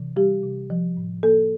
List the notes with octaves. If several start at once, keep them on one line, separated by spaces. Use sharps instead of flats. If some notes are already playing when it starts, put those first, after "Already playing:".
Already playing: C3 E3
G3 G4
C3
F3
A2
A#3 A4